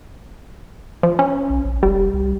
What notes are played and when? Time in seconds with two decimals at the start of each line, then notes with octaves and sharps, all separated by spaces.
1.03 F3
1.19 C#4
1.50 B1
1.65 A#1
1.83 E1 G3
2.14 C2